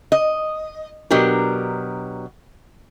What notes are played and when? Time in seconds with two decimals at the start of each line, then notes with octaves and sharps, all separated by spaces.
0.12 D#5
1.11 B2 F#3 D4 G4 A#4